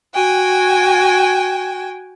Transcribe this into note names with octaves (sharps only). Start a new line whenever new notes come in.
F#4 G5 G#5